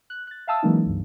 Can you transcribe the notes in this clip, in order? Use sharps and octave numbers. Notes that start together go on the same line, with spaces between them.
F#6
F#6 A6
E5 F5 G5 A5 D#6 E6
E3 F#3 G#3 A#3 C#4 D#4
C#2 G2